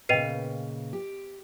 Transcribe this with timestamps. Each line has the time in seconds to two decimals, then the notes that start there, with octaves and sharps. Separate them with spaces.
0.09 A#2 C#3 B4 D#5 G5 C7 D#7 F7
0.93 G4